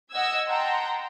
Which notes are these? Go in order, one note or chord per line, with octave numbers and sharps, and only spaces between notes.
D#5 F#5 E6 G#6
F#5 G5 A5 A#5 C6